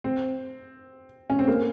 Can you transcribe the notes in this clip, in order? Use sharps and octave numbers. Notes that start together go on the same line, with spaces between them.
C4
C#4
C4
A#3